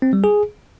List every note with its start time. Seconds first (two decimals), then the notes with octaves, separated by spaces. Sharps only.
0.02 C4
0.13 G3
0.24 G#4